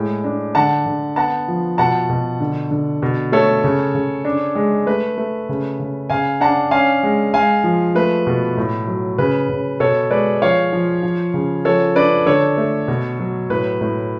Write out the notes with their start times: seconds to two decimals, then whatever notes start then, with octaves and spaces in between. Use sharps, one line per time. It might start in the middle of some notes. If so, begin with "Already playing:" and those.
Already playing: A2 G#3
0.24 D4
0.55 D3 F#5 A5
0.86 D3
1.16 B3 F#5 A5
1.48 F3
1.78 B2 F#5 A5
2.10 B2
2.40 D3
2.71 D3
3.02 B2
3.32 A3 A4 C#5
3.64 C#3
3.95 C#3
4.25 D4
4.55 G#3
4.86 A3 B4
5.18 A3
5.49 C#3
5.80 C#3
6.10 C#3 F5 G#5
6.40 D4 F#5 A5
6.71 C#4 F5 G#5
7.03 G#3
7.34 G#3 F5 G#5
7.64 F3
7.95 A3 B4
8.27 B2
8.57 A2
8.87 F#3
9.18 C#3 B4
9.49 C#3
9.80 B2 A4 C#5
10.10 G#3 B4 D5
10.42 F3 C#5 F5
10.73 F3
11.03 F3
11.34 C#3
11.65 F3 A4 C#5
11.96 D4 B4 D5
12.26 D3 A4 C#5
12.57 A3
12.88 B2
13.19 F#3
13.50 A2 B4
13.81 A2